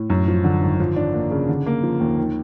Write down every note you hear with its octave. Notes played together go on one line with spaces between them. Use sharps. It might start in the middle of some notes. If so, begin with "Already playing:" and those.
Already playing: A2
F#2
F3
D3
G#1
F3
D4
A#3
C#3
D3
A#3
F3
D#2
D#3